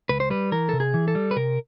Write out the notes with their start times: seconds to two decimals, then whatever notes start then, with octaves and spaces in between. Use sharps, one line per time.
0.09 C#2 B4
0.20 C5
0.30 G3 B4
0.52 E3 A#4
0.69 C3 A4
0.80 G#4
0.94 E3
1.08 A4
1.15 G3
1.31 B4
1.36 C3 A#4